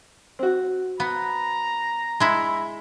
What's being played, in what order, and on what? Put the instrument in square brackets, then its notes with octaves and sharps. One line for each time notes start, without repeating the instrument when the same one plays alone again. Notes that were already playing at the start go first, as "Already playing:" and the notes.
[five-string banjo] C4 F#4
[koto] B3 [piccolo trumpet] A#5
[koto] G#3 E4